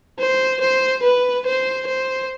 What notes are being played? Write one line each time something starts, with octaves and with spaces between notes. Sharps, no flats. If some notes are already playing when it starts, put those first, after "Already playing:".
C5
C5
B4
C5
C5